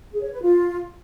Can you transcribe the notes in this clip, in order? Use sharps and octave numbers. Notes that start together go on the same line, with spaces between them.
G#4
C#5
B4
F4